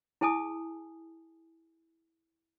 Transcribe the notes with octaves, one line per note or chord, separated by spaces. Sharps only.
E4 G#4 G#5 A5 D#6